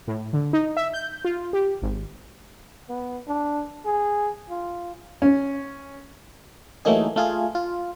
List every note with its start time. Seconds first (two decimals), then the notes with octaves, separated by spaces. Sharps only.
0.08 A2
0.33 D3
0.53 D#4
0.77 E5
0.94 G6
1.25 F4
1.53 G4
1.82 G#1
2.89 B3
3.27 D4
3.85 G#4
4.50 F4
5.22 C#4
6.85 E3 F#3 A3 A#3 D#4 G#4
7.16 A3 F4 G#4
7.55 F4